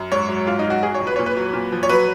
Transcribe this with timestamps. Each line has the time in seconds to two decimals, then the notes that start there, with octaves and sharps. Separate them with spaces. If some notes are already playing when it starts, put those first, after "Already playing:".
Already playing: F#2
0.12 G#2 C#5
0.29 F#3
0.46 G#2 F4
0.59 D#4
0.64 F#3
0.70 F#4
0.83 F#3 G#4
0.95 C#5
1.00 F2
1.07 B4
1.16 A#2 C#5
1.26 B4
1.37 F#3
1.53 A#2
1.72 F3
1.83 C#5
1.89 F#3 B4